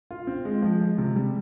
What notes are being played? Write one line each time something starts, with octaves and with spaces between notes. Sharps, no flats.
F4
C4
G#3
F3
G#3
C3
G3